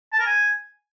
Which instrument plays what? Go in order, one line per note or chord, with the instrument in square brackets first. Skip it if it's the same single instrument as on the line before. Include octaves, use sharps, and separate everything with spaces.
[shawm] A5
A#4
G#5